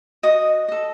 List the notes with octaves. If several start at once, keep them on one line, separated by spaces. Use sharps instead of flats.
F#4 D#5 D#6
A4 D#5